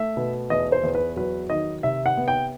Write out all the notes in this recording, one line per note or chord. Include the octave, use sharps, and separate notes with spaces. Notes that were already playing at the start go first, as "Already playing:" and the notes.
Already playing: A3 E5
B2
E2 D#5
C5
E2
B4
F#3 B4
D#3 D#5
C3 E5
F#5
B3
G5